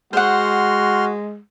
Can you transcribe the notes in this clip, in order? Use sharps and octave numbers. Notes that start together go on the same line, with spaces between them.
G#3 F#4 C5 F#5 C6 F6